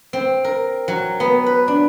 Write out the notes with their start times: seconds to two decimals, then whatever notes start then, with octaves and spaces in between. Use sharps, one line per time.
0.13 C4
0.44 A#4
0.88 F#3
1.20 B3
1.46 B4
1.68 D4